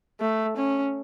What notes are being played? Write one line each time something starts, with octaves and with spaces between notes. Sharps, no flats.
A3
C#4